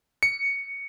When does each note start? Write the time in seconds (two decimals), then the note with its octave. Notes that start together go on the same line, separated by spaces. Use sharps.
0.23 C#7